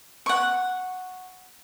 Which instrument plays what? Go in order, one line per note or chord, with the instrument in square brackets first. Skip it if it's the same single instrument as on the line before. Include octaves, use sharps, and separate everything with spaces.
[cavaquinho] F#5 C#6